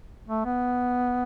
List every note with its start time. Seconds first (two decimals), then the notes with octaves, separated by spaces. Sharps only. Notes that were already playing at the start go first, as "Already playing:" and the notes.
0.28 A3
0.45 B3